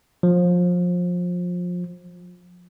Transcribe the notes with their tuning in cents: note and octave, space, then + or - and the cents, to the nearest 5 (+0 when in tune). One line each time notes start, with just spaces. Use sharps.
F3 +25